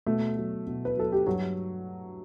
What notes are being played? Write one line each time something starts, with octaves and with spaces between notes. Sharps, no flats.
B2 A3
F#3
B2
B4
F#3 A4
G4
G2 F#3 F#4